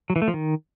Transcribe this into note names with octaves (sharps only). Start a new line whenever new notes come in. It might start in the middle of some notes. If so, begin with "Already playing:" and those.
F#3
E3
A3
F3
D#3